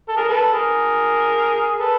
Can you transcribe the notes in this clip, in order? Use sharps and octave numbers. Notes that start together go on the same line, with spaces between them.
A4
G#4 A#4
A4 B4
G#4 A#4
A4 B4